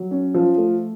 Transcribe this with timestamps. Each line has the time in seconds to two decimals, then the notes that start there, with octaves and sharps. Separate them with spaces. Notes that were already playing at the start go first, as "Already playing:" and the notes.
Already playing: F#3
0.11 C#4
0.34 F3
0.58 A3